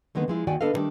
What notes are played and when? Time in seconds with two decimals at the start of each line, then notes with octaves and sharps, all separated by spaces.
0.15 D3 D#3 G#3 A#3 B3
0.28 F3 G#3 E4
0.47 D#2 D#3 F#4 D5 G5 G#5
0.61 D3 D4 A4 B4 D#5 F5
0.74 D3 D#3 G3 A3 D4